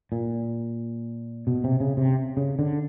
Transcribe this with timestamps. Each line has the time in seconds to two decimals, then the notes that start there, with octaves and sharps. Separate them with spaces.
0.12 A#2
1.47 B2
1.64 C3
1.80 C#3
1.97 C3
2.37 C#3
2.59 D3